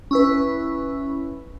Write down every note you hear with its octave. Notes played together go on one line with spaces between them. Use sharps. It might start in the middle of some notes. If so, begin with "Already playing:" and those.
C#4 E4 B4